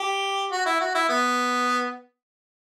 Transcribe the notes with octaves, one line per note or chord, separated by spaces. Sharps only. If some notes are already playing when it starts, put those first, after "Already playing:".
Already playing: G4
F#4
E4
F#4
E4
B3